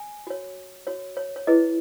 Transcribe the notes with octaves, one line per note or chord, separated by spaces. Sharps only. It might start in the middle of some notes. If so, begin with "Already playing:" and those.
Already playing: G#5
F#4 C#5
F#4 C#5
C#5
C#5
E4 G#4 B4 D#5